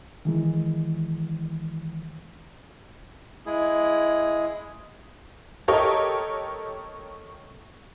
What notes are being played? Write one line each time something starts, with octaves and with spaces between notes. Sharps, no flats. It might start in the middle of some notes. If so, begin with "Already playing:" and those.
D#3 E3 G#3
G#3 E4 G#4
G4 A4 A#4 C#5 D#5